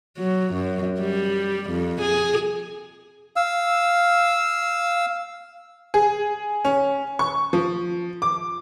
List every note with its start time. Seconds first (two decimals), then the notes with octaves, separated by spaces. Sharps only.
0.18 F#3
0.53 F#2
1.00 G3
1.70 F2
2.01 G#4
3.36 F5 E6
5.94 G#4
6.65 C#4
7.19 C#6
7.53 F3
8.22 D6